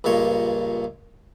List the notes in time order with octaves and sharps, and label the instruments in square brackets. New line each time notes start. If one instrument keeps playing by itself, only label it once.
[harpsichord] C#2 G2 A#2 C#5